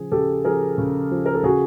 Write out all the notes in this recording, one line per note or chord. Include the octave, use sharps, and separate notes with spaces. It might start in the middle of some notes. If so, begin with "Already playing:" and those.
Already playing: C#3 F3 G#4
C#3 G4 A4
F3 G#4 A#4
C#3
F3
A#4
A4
C#3 F#4 G#4